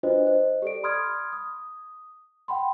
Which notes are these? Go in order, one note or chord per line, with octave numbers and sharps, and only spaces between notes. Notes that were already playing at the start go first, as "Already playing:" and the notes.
D4 F4 F#4 B4 C5 D#5
C5 D#5
G4 A4 D5 D7
B5 C6 D#6 F6 G#6
D#6
F#5 G5 B5 C6